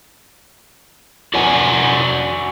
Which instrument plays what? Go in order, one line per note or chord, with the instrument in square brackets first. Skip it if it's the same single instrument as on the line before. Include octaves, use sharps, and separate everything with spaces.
[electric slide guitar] F#4 D5 F#5 G#5